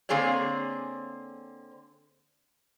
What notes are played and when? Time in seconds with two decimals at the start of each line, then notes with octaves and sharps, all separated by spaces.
0.09 D3 A#3 C4 G#4 C#5 D5